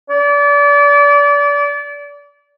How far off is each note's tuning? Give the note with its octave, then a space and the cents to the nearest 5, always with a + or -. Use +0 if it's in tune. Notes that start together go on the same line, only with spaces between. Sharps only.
D5 -30